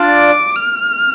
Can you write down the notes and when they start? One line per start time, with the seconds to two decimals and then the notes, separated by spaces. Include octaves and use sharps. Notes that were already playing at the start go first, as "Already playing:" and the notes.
Already playing: D4 F4 D5 A5
0.13 D6
0.56 F6